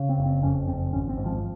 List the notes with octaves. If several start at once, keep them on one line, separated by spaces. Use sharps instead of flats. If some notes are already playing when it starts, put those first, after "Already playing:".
Already playing: C#3
C4
F#1
C4
F2 C#4
F#1 C4
G#1 C#4
C4
G#2
F3